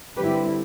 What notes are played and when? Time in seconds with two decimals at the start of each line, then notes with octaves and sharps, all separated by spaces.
0.17 D3 G3 C4 E4 G4 B4